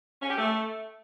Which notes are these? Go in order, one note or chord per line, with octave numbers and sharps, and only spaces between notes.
C#4
G4
A3